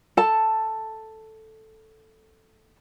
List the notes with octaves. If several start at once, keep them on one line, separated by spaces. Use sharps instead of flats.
A4 A5